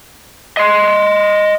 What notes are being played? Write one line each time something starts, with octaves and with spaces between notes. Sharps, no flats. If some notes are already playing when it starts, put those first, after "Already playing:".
D#5 C6